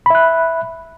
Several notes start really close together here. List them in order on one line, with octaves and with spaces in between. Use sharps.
B5 E5 F#6